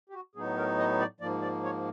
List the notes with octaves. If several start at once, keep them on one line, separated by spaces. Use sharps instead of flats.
G4
F#4
A2 F#3 B3 D#4 G#4
A#4
D#5
D5
G#2 F3 A#3 D5
D5
C#5